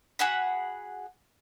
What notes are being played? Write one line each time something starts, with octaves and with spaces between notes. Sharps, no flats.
F#4 G#4 F#5 B5